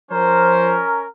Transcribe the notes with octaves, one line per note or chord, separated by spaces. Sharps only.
F3 C#4 A#4 C5